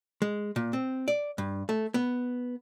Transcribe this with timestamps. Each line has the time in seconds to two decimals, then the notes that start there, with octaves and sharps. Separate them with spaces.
0.22 G#3
0.56 A#2
0.73 C4
1.08 D5
1.38 G2
1.69 A3
1.94 B3